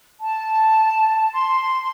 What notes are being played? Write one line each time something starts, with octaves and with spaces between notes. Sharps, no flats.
A5
C6